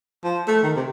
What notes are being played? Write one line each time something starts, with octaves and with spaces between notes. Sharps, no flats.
F3
A3
D#3
C3